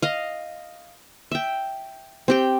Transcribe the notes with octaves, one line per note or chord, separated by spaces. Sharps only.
D#5 F5
E5 G5
C4 G4 G5